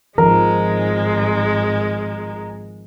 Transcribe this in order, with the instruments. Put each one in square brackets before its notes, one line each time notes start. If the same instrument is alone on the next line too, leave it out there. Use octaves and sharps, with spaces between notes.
[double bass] G#1 [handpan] D#3 F3 [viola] G#3 [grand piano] A#4